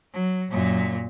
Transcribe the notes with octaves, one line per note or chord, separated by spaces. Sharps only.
F#3
F#2 A#2